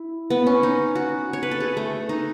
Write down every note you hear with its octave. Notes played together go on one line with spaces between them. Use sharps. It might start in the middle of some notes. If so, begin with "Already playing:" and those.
Already playing: E4
B3
C#4
D#4
F#4
C#5
B4
A4
G#4
A3
D#4